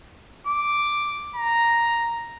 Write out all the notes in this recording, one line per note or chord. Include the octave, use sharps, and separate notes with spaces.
D6
A#5